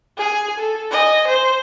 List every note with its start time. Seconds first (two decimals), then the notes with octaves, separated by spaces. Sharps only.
0.18 G#4 G#5
0.59 A4
0.91 D#5 G#5
1.27 C5